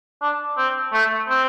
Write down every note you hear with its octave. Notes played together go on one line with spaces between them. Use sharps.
D4
C4
A3
C4